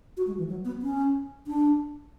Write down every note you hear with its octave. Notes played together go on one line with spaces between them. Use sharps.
F#4
G#3
E3
F#3
B3
C#4
D4